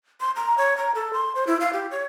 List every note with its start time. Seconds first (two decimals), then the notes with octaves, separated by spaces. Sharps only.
0.21 C6
0.36 A#5
0.58 C#5
0.78 A#5
0.95 A4
1.13 C6
1.35 C5
1.47 E4
1.60 F5
1.73 G4
1.91 C#5